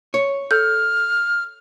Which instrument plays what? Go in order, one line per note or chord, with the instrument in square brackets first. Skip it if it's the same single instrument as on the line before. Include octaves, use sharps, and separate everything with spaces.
[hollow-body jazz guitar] C#5
[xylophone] A4 G6 [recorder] F6